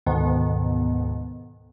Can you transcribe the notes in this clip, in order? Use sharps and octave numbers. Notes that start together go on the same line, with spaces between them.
D2 G#2 B2 D#3 B3